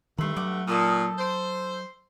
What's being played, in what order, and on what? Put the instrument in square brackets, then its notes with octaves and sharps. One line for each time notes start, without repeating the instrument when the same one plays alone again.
[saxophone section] G2 A3 [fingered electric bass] D#3 G3 [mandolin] B5 C6
[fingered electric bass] F#3 [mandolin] F#5 D6
[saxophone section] A#2 [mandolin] D#4 A4 D#6
[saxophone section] C5